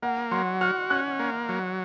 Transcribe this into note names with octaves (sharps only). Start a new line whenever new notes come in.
A#3 F#5
F#3 C6
F#4 F6
C#4 F#6
A#3
F#3